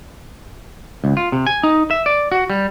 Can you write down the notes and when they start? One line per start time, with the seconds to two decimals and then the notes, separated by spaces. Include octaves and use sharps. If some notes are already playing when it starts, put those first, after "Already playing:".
1.04 C#2
1.17 F4
1.32 C3
1.47 G#5
1.63 D#4
1.91 E5
2.06 D5
2.32 F#4
2.50 G3